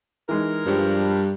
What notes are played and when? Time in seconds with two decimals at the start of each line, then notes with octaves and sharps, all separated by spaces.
0.29 E3 G#3 D#4 A#4
0.66 G2 F3 G#3